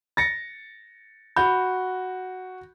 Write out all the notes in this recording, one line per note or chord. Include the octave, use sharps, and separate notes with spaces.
A6 A#6 C#7
F#4 B5 G6